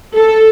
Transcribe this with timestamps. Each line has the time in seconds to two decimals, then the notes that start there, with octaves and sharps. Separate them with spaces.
0.16 A4